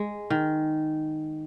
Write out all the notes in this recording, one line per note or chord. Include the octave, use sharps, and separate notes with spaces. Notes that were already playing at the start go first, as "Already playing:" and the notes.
Already playing: G#3
D#3